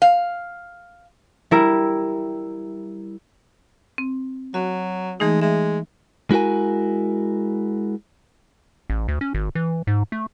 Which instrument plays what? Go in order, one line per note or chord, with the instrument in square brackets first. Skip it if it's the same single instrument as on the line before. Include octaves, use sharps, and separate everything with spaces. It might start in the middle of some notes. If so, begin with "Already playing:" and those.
[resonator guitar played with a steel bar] F5
[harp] G3 E4 A#4
[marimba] C4
[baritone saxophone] F#3 [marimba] F#4
[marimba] E3 A3 D#4 [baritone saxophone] G#3
[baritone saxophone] G#3 [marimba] E5
[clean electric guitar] G#3 E4 F#4 A#4 G#5
[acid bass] A1
D2
C#4
G#1
E3
G#2
A3